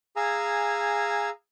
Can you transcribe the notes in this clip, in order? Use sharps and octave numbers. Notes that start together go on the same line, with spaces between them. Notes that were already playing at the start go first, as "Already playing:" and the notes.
G#4 F5 G#5 A#5 E6